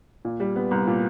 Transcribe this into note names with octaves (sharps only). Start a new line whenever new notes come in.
A#2
G3
B3
C2
A#2